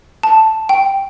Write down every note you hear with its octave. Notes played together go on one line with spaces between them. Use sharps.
A5
G5